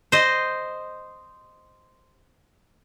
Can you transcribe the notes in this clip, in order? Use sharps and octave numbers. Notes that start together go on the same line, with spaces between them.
C5 D#5